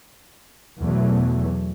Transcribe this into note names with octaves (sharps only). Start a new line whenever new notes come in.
E2 B2 E3 F#3 A3